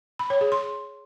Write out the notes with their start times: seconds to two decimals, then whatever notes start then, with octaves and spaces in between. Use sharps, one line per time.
0.19 B5
0.30 C#5
0.41 G#4
0.52 C6